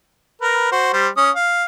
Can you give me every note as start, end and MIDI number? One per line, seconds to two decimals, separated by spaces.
0.41 0.68 70
0.41 0.68 71
0.72 0.93 66
0.72 0.93 72
0.93 1.08 55
0.93 1.08 72
1.17 1.30 61
1.17 1.30 87
1.35 1.65 77